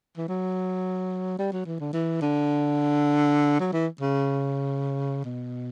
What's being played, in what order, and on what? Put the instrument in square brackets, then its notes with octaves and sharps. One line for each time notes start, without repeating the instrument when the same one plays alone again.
[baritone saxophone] E3
F#3
G3
F#3
E3
D3
E3
D3
F#3
E3
C#3
B2